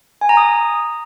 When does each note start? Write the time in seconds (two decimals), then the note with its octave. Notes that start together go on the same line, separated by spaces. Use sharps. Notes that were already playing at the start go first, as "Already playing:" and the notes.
0.21 G#5
0.29 A#5
0.37 D#6